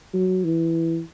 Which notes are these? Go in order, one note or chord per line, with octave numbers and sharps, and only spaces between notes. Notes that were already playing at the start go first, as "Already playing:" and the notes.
F#3
E3